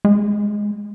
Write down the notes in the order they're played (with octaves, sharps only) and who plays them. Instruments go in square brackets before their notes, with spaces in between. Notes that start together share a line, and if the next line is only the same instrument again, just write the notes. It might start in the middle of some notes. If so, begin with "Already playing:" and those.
[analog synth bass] G#3